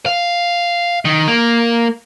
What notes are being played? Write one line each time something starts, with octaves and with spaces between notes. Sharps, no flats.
F5
D#3
A#3